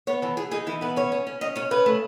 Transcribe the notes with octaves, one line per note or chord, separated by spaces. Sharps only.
B3 C#5
E3 A4
E3 G#4
D#4 G#4
E3 E4
B3 B4
C#4 C#5
C#4
C#4
C#4 D#5
C#4 C#5
C#3 B4
A3